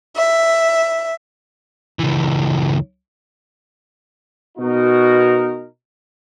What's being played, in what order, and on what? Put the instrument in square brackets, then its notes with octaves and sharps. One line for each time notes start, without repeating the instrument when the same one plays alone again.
[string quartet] E5
[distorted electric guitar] C#2 E3
[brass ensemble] B2 D#4 F#4 A#4